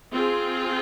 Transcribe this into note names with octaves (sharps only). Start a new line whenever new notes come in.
C4 F4 G#4